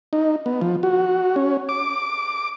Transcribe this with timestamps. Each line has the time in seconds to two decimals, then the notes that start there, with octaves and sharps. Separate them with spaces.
0.13 D#4
0.46 B3
0.61 F3
0.83 F#4
1.36 C#4
1.69 D6